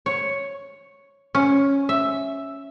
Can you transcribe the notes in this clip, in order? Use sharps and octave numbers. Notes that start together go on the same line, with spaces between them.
C#5
C#4
E5